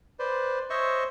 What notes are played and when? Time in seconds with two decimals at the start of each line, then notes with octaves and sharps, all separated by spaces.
0.19 B4 C5 D5
0.70 C5 C#5 D#5 E5 C#6